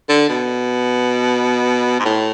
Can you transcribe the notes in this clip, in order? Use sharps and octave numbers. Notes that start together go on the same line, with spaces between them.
D3
B2
G#2
A2